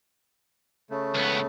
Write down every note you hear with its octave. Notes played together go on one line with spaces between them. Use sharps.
C#3 A3
C#2 B3